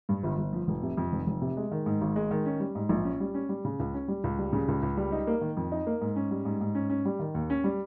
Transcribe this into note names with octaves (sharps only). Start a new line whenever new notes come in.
G2
G1
G1
F3
F1
C3
F2
F1
F1
C3
G#3
D#3
G#2
G#1
G#3
D#3
C#4
G3
G#2
A#1
C#4
G3
C#4
G3
C#3
C#2
C#4
G3
C#2
G3
C#3
C#2
C#2
G3
D#4
A#3
D#3
F2
D#4
A#3
G#2
C#4
G3
G#2
G#2
C#4
C#4
G3
D#3
D#2
C#4
G3